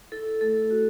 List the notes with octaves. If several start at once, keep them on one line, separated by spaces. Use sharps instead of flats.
E4 A4
A3 A4
F#4